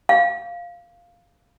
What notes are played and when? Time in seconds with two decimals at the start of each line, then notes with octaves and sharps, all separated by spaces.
0.09 F5